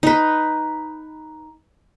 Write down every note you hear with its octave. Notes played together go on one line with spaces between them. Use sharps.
D#4 B4